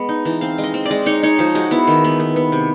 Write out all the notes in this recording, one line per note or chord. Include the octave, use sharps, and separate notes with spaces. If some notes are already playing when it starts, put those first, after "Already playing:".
Already playing: G#3 B3
D#4
E3
C4 F5
G#3
D#5
C4
D5
G#3
D#4 C#5
D#4 C#5
F3 G#4
G#3 F#4
B3 E4
D#3
B3
B3
B3
C3